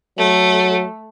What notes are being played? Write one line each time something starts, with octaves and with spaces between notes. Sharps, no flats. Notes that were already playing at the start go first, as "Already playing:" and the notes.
F#3 A3